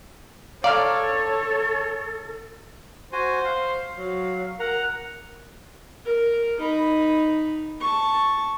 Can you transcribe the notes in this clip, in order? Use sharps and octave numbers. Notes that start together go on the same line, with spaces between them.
A4 C#5 D5 F5 A#5 F6
F#4 C5 G#5
F5
F#3
A#4 F#5 A#5
A#4
D#4 B5
A5 C#6